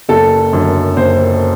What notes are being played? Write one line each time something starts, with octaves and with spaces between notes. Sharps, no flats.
F#1 A4
F#2 D3
F#1 C5